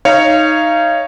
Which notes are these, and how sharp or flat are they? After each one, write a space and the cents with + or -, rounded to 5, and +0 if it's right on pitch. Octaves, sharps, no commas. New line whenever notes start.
D#4 +0 C#5 +0 F5 -25